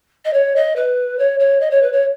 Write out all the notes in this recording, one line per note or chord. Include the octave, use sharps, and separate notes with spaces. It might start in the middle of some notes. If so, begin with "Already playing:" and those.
D#5
C#5
D#5
B4
C#5
C#5
D#5
C#5
B4
C#5